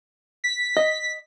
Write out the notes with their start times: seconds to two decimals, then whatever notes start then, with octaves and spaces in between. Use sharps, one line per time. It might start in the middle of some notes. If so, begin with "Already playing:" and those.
0.44 B6
0.77 D#5